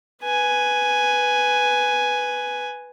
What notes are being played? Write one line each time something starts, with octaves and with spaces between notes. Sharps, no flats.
B4 G#5